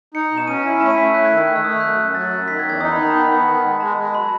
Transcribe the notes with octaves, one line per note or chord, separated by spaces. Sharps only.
D#4 C#7
B2
E7
C#4 D#7
E4
A3 E7
D#7
A3 B6
E6
E4 F#6
G#6
D#3
E6
A3 F#6
E6
A3 D#6
E6
F#2 F#6
F#2
F#3 A6
F#2
D#3 B6
G#6
E2
G#6
D#4 D#6
B5
D#3
B5
A5
B3 B5
B3
D#3
G#3
G#3 A5
G#3
F#3 B5